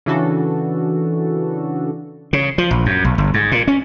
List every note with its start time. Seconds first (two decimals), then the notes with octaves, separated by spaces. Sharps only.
0.06 C#3 E3 D4 F#4 A4
2.33 C#3
2.58 F3
2.71 A#1
2.86 F#2
3.04 B1
3.18 G1
3.34 G#2
3.52 A#2
3.68 C#4